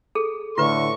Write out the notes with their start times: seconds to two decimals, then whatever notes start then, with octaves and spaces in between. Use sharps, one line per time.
0.15 G#4 A4
0.58 A2 D3 F4 B4 C#6